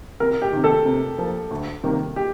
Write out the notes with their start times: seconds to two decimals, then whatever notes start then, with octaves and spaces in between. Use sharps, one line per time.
0.20 C2 A#4
0.42 G4
0.53 C3 D#3
0.64 A4
0.85 C3
1.18 F3 A#3
1.51 D2
1.84 C3 D#3 G3 A#3
2.16 G4